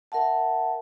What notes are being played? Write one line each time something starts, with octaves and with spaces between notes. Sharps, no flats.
A#4 E5 F#5 A5